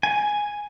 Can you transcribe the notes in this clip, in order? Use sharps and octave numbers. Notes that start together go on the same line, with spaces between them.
G#5